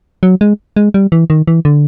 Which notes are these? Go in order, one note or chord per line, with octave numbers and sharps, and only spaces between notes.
F#3
G#3
G#3
G3
E3
D#3
E3
D3